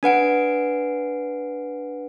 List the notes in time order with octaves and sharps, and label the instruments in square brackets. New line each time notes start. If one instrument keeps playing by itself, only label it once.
[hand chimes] D4 B4 F#5 D7